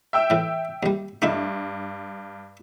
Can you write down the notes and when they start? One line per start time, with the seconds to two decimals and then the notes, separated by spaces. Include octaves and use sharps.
0.13 E5 G5 E6
0.30 A2 E3
0.83 D#2 G3
1.22 G2 A3 D#4 E4